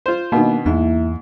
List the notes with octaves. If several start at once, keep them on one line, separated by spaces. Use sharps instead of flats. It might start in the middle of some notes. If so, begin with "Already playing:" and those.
F4 C5
B2 D#3 A#3 B3 D4 F#4
E2 G#2 A#3 E4 E5